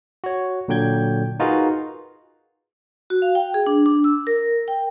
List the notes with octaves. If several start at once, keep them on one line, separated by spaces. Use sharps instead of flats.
F#4 C#5
A#2 D3 F#3 G5 G6 G#6
D#4 F4 F#4 G#4 A#4 B4
F#4
F5
G5
G#4
D4
D4
E6
A#4
G5